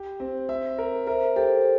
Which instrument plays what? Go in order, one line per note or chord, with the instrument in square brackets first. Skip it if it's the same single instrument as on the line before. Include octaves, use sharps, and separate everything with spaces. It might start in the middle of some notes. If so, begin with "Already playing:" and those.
Already playing: [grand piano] G4
C4
E5
A#4
[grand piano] A#4 [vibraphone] C5 E5
[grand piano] G4 [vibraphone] A4 C5